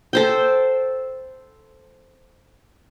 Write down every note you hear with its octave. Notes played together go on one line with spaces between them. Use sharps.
A4 C5 G5